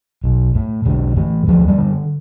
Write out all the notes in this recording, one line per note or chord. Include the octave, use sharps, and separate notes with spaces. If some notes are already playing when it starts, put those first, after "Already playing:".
B1
A2
B1 D3
A2 E3
D2 F3
G3
D3